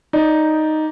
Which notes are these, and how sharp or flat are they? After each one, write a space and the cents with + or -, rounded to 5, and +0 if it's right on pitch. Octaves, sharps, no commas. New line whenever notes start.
D#4 +0 D5 -5